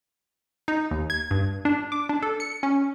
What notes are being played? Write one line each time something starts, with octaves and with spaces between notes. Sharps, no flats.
D#4
D#2
G#6
G2
D4
D6
D4
A4
C#7
C#4